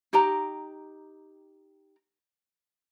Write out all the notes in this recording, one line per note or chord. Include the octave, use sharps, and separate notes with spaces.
D#4 G4 G5 A#5